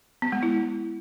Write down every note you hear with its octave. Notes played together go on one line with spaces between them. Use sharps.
B3
G#3
E4